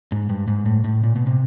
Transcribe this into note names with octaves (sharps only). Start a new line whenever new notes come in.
G#2
G2
G#2
A2
A2
A#2
B2
C3